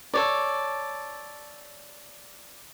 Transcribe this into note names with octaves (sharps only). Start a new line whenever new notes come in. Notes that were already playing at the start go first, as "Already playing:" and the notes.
A4 C#5 D5